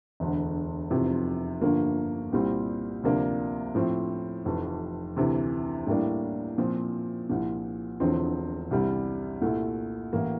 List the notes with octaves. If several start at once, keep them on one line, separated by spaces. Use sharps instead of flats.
E1 D2 D3
F1 E2 C3 F3 C4
G1 G2 D3 F3 A#3
C2 A#2 G3 C4
D2 C3 F3 A#3 D4
A2 F3 C4
F1 F2 E3
D2 C3 E3
A2 G3 A#3 D4
A#2 F3 C4
C2 A#2 F3
E1 E2 D3 F3 C4
C2 C3 G3
C2 A#2 A3
A1 A2 E3 A#3